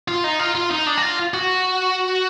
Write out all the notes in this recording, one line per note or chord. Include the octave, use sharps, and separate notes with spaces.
F4
D#4
F4
F4
D#4
D4
F#4
F4
F#4